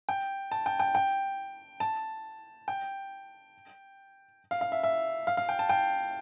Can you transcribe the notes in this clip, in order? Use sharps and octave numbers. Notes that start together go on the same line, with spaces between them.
G5
A5
G5
G5
G5
A5
G5
F5
F5
E5
E5
F5
F5
G5
A5
G5